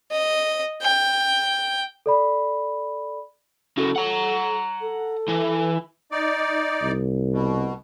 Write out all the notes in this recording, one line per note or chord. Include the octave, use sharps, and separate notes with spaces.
D#5
G5
A4 D5 B5
C#3 F#3 A4
F#5 A#5
A4
E3
D#4 D5
C2
B2